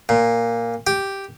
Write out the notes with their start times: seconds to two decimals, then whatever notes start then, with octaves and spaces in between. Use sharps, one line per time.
0.09 A#2
0.87 G4